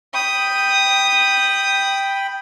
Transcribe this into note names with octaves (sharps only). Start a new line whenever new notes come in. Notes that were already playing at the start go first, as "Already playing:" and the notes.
G5 B5 D#6